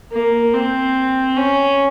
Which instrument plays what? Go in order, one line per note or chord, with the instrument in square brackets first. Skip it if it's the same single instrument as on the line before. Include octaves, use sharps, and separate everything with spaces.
[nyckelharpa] A#3
C4
C#4